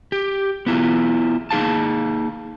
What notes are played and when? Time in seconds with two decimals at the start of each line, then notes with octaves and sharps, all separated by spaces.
0.12 G4
0.67 B3 E4 F4
1.51 A#3 D#4 G#4 F5 A5